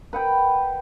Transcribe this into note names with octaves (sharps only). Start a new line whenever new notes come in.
B4 F#5 G5